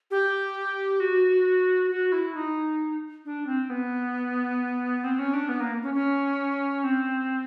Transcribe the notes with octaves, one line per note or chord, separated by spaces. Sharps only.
G4
F#4
F#4
E4
D#4
D4
C4
B3
C4
C#4
D4
B3
A#3
C#4
C#4
C4